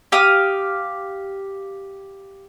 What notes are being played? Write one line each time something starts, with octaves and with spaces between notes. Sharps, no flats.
G4 F5 D#6